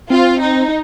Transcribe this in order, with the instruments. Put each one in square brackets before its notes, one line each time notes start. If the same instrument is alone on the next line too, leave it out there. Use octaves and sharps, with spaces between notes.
[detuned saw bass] C4 [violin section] F4
[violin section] D#4